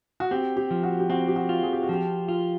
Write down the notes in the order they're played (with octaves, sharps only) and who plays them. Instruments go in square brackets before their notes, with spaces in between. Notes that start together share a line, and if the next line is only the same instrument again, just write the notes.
[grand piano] F#4
[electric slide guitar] C4 [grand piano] G4
[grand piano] G4
[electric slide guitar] F3
[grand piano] F#4
G4
[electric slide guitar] C4 [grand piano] F#4
[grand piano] G4
F#4
[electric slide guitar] F4
[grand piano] G#4
G4
F#4
[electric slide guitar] F3 [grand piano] G4
[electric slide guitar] F4